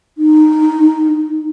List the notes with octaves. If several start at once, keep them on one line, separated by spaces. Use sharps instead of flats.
D#4